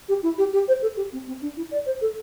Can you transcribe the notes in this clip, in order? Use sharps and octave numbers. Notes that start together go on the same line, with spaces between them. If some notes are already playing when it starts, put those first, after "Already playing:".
G4
E4
G4
G4
C5
A4
G4
C4
C4
D4
E4
D5
C5
A4